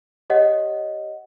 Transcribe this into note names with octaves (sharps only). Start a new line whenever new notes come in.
G4 C#5 D#5 F#5